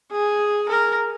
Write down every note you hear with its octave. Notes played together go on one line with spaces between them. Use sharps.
G#4
A#4